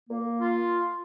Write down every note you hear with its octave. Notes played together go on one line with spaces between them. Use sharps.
A#3
F4